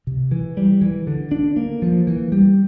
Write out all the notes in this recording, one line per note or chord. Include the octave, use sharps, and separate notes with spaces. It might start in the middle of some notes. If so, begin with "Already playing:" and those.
C3
E3
G3
E3
D3
D4
A#3
F3
E3
G3